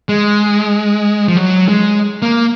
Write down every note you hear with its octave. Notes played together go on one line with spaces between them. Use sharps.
G#3
F3
F#3
G#3
A#3